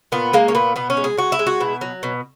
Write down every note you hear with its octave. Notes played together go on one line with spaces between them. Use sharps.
A#2 B3
G#3 A#3
C#4
A#2 B3
B2 B3
C#4
G#3
G#4
G#3 F#4
E4
G#3
F#4
B2 E4
F#3
B2